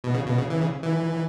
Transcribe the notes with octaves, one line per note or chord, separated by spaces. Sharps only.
B2
C#3
B2
C#3
E3
C#3
E3